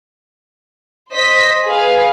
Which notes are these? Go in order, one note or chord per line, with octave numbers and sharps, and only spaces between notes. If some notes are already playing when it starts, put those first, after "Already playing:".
C5 D#5 B6
G#4 B4 F5